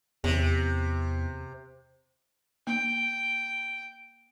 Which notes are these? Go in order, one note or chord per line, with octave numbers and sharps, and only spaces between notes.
E2 C3
A#3 G5